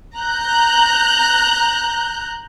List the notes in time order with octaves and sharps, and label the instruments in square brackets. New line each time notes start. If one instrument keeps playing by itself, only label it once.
[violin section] A#5 F#6 G6